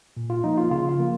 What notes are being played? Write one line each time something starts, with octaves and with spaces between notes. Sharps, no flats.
A#2
F4
F3 A#3 D#4
F4
C#3 F4
F4
F3 A#3